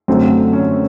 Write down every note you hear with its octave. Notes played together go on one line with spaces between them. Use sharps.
F#2 D3 F#3 A3 C4
C#4